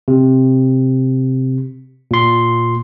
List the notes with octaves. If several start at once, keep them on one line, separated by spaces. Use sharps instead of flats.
C3
A#2 C6